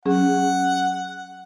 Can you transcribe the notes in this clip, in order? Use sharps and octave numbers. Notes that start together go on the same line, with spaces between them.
F#3 C#4 G#4 F#5